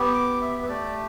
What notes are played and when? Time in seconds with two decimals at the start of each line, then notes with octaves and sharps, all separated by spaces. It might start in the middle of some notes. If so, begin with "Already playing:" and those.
Already playing: B3 G4
0.14 D6
0.41 E5
0.62 B4
0.69 A3 G4 D5